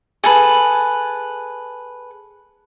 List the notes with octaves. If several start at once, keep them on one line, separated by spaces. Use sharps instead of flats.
G#4 A4 B4